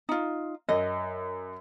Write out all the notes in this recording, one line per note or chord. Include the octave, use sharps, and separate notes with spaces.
D#4 F4
F#2 D#5